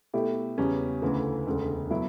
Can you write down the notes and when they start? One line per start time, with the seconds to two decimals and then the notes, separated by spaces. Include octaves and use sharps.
0.14 B2 A3 E4 G4
0.58 E2 C#3 G3 C#4
1.02 D2 C#3 E3 A3
1.46 E1 D2 C#3
1.90 B2 F#3 B3 E4